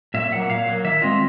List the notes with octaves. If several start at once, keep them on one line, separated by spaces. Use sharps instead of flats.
A#2 E5
F#3 A#3 F#5
A#2 F5
F#3 A#3
D#3 E5
G#3 C4 F4 D#5